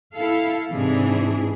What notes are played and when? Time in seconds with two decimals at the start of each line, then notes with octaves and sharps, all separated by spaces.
0.13 E4 A4 F5
0.71 G#2 C3 E3 D4 G#4